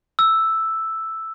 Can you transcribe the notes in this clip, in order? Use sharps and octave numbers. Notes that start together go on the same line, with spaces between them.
E6